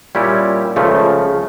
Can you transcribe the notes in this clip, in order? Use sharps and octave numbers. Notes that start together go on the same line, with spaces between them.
A#2 G3 C#4 E4 G4
C#2 C#3 F3 A3